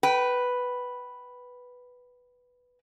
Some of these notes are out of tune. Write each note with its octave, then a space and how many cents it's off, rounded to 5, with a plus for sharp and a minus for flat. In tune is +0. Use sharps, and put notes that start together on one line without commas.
B4 +0 G5 -30